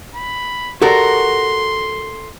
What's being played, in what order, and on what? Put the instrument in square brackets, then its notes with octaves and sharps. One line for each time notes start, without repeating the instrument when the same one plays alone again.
[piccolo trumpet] B5
[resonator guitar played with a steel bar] F#4 A#4 [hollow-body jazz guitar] G4 A4 D5 [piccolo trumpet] C6